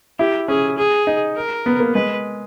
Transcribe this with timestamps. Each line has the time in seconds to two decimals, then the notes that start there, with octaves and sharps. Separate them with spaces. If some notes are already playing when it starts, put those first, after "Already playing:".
0.19 E4 G4
0.48 C#4 G#4
0.78 G#4
1.07 D#4
1.36 A#4
1.66 B3
1.80 A#3
1.94 G#3 B4